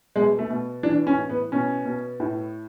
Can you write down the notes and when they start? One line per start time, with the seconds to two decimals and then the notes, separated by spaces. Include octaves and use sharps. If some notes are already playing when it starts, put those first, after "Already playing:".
0.16 B2 G#3
0.39 A3
0.50 B2
0.83 E3 D4
1.07 C#4
1.18 A2
1.29 B3
1.52 B2 C#4
1.85 B2
2.20 A2